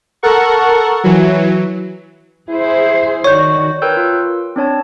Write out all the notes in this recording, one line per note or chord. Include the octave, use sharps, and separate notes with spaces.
A4 A#4 F#5 C#6
E3 F#3
E4 G#4 C5
D#3 F#4 C#5 D5 C#6 G6
A#4 B4 C#5 G5 E6 G6
F4
C4 D4 C#5 A5